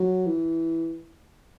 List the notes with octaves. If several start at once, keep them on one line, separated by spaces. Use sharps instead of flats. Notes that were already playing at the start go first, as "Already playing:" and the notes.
Already playing: F#3
E3